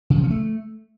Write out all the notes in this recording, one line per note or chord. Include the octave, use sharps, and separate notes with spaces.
C#3
F3
C#4
A3